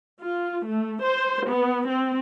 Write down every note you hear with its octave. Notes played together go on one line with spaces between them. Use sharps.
F4
A3
C5
B3
C4